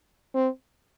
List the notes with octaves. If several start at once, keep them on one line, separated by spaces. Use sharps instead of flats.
C4